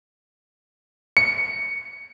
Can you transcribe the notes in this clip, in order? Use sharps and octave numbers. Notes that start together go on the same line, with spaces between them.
C#7